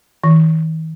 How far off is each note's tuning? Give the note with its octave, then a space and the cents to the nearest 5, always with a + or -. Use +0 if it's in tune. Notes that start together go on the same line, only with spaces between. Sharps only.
D#3 +45